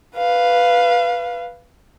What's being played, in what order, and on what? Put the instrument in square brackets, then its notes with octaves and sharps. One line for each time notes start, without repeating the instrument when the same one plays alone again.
[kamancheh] B4 F5